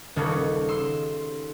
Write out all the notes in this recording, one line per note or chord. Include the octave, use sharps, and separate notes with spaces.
D#1 C#3 A4 C#5
C6 E6